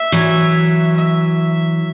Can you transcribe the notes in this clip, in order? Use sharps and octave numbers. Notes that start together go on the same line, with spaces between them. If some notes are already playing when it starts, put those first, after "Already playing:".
Already playing: E5
E3 F#3
E5